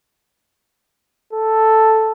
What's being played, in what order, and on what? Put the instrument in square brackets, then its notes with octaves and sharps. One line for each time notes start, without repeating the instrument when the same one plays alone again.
[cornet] A4